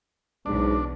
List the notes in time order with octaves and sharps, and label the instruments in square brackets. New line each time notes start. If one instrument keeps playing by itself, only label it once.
[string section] B1 E2 [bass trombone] G#2 [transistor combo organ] D4